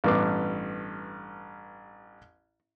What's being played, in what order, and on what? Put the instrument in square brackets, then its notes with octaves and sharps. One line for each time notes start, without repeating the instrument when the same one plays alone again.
[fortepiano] A1 G2 B3 D6